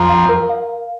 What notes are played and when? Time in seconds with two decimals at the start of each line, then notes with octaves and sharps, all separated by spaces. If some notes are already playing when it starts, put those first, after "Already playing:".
Already playing: F2 F3 A#5
0.09 F5
0.29 A#4
0.49 F5